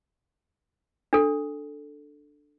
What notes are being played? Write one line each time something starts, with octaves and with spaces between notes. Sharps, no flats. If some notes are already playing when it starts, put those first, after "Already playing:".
D4 A4